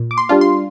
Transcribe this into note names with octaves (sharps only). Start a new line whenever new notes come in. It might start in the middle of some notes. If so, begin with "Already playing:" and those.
Already playing: A#2
D6
C6
G3 D4 F4
C6